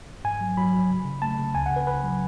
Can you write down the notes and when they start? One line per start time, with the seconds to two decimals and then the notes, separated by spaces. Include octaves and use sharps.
0.24 G#2 G#5
0.41 F#3
0.57 F#3 B5
0.73 F#3
0.90 C#3
1.05 C#3
1.22 A3 A5
1.39 C#3
1.55 C#2 G#5
1.66 F#5
1.71 C#3
1.76 B4
1.87 C#2 B4
2.04 F#3